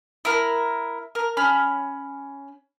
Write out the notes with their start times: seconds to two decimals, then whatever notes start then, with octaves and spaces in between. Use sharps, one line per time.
0.25 E4 A#4
1.15 A#4
1.37 C#4 B5 F6